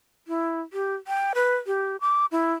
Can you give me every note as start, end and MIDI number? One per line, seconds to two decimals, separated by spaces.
0.28 0.60 64
0.73 0.95 67
1.07 1.33 79
1.35 1.56 71
1.67 1.97 67
2.01 2.26 86
2.32 2.54 64